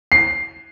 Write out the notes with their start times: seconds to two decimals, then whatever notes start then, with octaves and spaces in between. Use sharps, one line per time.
0.12 C7